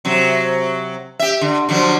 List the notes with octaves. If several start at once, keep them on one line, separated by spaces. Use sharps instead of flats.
C3 F#3
G4 E5
D3
D3 F3 F#3